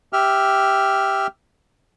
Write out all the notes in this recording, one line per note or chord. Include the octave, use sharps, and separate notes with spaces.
G4 E5 F6